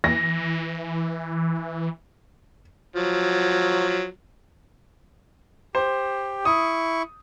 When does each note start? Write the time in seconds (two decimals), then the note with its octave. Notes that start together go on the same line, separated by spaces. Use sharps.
0.04 E3 A#6
2.96 F3 F#3
5.75 G4 C5
6.45 E4 C#6 D#6